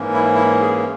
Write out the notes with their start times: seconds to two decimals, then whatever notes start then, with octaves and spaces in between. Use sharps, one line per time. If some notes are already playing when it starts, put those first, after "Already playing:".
Already playing: G#2 E3 A#3 C#4
0.13 E4
0.35 E4
0.62 G#4